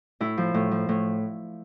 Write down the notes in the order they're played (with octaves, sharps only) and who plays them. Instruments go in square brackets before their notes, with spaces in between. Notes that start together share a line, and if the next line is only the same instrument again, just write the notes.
[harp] A2 E4
F3
A2
F3
A2